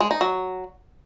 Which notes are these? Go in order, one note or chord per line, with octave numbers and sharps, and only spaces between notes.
G#3
D#4
F#3